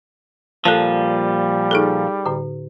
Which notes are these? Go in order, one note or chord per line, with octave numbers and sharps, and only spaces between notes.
A#2 F3 G3 A4 A5
D#4 G#4 A4
A2 D3